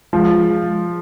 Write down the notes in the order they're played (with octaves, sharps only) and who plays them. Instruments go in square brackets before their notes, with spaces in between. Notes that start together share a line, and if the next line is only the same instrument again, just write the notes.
[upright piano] F3 [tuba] G#3